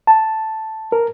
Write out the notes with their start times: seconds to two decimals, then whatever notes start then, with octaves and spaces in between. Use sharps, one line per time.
0.07 A5
0.92 A#4